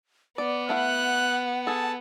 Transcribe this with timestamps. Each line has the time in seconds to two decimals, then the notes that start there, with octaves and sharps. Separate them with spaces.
0.38 B3 D5 D6
0.69 A3 E4 F5 F#5 F#6
1.67 G#4 A4 A5